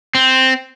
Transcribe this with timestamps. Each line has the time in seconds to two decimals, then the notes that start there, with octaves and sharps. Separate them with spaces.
0.15 C4